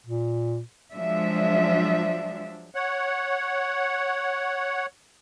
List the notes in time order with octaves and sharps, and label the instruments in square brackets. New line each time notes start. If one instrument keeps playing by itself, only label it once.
[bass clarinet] A#2
[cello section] F3 F#3 G#3 D4 E5
[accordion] C#5 F#5